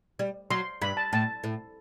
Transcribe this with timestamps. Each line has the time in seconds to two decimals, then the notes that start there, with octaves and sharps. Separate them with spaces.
0.19 G3
0.50 F#3 C6
0.82 G2 B5
0.97 A5
1.13 A2 A5
1.44 A2